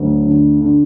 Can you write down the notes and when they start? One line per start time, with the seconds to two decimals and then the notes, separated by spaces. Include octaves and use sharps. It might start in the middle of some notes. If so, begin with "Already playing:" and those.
Already playing: D2 F#3
0.27 D3
0.61 D3